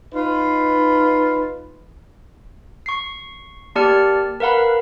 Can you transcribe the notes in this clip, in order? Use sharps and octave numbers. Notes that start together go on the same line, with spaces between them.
D#4 F4 B4
C#6 C7
A#3 G4 D5 A5 F6 C#7
A#4 B4 F5 F#5 B5